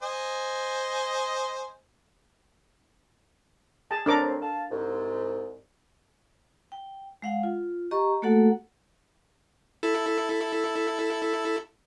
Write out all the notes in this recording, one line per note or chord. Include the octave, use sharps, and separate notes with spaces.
C5 D#5 G#5
G#4 A5
C#3 A3 C4 D4 A#4 D6
F5 A5
C2 G#2
G5
G#3 F5 F#5
F4
G4 D#5 A#5 C#6
A3 A#3 F#4 A4 F#5
E4 A4